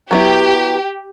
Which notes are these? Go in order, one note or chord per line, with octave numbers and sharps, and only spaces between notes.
F#3 B3 E4 G4